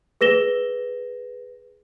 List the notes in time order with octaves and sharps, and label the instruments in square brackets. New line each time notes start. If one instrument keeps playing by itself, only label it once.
[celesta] G#4 B4 A#6 E7 G7